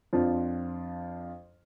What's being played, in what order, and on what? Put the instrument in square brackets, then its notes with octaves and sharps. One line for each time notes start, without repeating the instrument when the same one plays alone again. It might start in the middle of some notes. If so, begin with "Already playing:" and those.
[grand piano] F2 F3 D4 F4